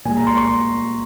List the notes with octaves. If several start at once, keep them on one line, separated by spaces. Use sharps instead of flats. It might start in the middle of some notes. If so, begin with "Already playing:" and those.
A#2 G#3 G#5
A#5
C6
C#6